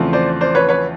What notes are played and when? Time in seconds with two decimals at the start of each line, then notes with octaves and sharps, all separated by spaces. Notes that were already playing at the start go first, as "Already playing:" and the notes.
Already playing: E2 C#3 F3 A3 C4
0.13 C5 D5
0.41 C5 D5
0.55 B4 C#5
0.69 B4 C#5